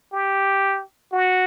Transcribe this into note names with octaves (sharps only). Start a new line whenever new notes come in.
G4
F#4